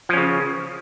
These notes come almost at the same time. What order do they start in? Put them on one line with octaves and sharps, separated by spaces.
F3 C#4 C#3